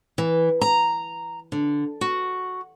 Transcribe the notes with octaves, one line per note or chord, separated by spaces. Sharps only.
E3
A#5
D3
F#4